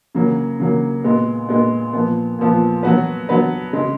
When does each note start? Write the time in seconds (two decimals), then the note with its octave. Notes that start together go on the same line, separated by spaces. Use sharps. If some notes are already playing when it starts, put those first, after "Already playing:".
0.15 C#3 F#3 A#3
0.60 C#3 F#3 A#3
1.04 A#2 G#3 B3
1.49 A#2 G#3 B3
1.93 A#2 F3 B3
2.39 A#2 F3 B3
2.83 F#3 B3 F#4 B4
3.29 F#3 B3 F#4 B4
3.73 C#3 G#3